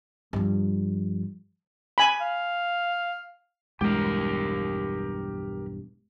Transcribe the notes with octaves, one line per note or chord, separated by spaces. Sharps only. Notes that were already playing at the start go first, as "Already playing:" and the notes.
G2 F3
G#5 B5
F5
B1 E2 G2 G#3 G4 A#4